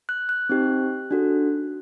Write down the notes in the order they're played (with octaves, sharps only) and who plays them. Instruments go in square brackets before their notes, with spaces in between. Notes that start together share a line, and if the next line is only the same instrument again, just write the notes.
[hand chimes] F#6
F#6
C4 D#4 G4
D4 F#4 A4